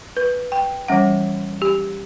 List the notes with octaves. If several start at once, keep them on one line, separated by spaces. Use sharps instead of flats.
B4
G5
E3 G3 C#4 F#5
G4